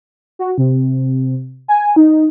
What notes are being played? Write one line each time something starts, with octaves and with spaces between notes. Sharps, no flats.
F#4
C3
G#5
D#4